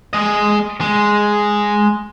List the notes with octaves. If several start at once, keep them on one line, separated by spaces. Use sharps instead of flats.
G#3 D#5
G#3